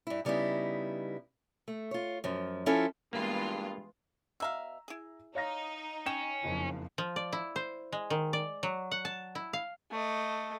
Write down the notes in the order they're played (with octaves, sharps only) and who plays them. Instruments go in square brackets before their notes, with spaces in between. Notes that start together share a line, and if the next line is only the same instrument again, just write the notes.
[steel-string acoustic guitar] G2 E4
C#3 G3 B3 D#4 E4
A3
F4 C#5
F#2 F3
F3 C#4 E4 F4 A4
[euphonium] G2 [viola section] E3 G#3 B3 [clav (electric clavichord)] A#3 [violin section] F4
[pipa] B2 E5 F5 [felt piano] A#5 E6
[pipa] E4 G#4
[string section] D#4 [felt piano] C#5 F5 A#6
[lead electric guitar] C#4 [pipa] G5 [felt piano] E7
[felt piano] F#1 D#4 [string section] F2 F3
[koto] F3
D5
E4
C5
G#3
D#3
D5
F#3
F#5
A5
E4
F5
[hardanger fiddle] A3 D#5